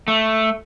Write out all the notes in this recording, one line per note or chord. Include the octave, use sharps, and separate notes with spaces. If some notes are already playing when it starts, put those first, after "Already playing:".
A3